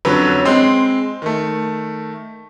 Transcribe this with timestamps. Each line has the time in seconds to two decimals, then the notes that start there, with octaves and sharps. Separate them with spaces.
0.05 F2 D3 F#3 C#4 B4
0.45 G#3 C4 C6
1.22 D#3 A3